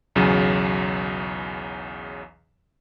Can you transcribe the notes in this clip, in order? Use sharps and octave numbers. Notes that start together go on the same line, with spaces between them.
B1 E2 C#3 F#3 D#7